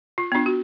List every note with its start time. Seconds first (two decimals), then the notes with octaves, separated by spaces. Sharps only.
0.18 F4
0.32 B3 D4 F4
0.46 F#4